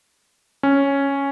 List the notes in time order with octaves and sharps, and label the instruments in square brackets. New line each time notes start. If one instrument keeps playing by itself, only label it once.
[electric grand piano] C#4